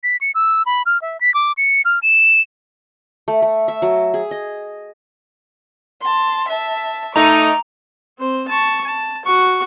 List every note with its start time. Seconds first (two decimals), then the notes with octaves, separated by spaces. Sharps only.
0.03 B6
0.21 C#7
0.35 E6
0.66 B5
0.86 F6
1.02 E5
1.21 B6
1.34 D6
1.57 C#7
1.85 F6
2.03 E7
3.28 A3
3.42 A3
3.68 E5
3.82 F#3
4.14 G#4
4.31 D#5
6.02 A5 C6
6.47 E5 A5
7.16 A3 D#4 A#5 D6
8.19 C4 C5
8.48 A5 C#6
8.84 A5
9.25 F#4 C#6